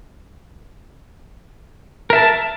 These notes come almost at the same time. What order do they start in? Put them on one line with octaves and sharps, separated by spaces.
A#4 E5 A5